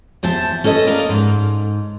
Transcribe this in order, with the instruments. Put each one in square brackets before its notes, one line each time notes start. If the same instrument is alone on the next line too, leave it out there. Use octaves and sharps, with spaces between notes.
[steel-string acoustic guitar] E2 C5 E5 A5
C#4 A4 B4 D#5
A#4 D5 D#5 F5
G#2